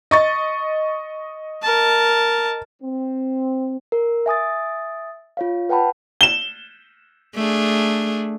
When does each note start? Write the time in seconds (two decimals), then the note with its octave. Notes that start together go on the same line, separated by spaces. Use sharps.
0.11 D#5 C#6 A6
1.63 A#4 A5
2.82 C4
3.92 A#4
4.26 E5 G#5 D#6 A6
5.37 F4 C#5 F5
5.69 B4 F#5 G5 A5 B5
6.21 E7 G7
7.35 A3 D4 G#4